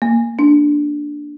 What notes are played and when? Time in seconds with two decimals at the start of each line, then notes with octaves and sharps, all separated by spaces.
0.02 A#3
0.39 D4